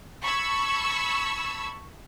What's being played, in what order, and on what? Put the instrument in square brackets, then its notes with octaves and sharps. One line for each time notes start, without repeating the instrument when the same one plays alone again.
[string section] A5 B5 C#6 E6 G#6